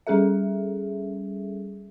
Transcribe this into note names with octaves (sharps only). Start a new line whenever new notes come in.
G3 C#4 G#4 A4 E5